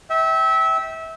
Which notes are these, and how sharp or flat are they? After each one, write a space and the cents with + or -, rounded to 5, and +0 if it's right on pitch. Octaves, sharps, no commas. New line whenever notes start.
E5 -25 G5 -15